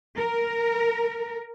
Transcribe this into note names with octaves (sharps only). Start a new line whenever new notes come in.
A#4